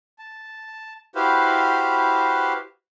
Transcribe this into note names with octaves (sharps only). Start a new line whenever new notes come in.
A5
E4 F#4 G4 B4 C5 F5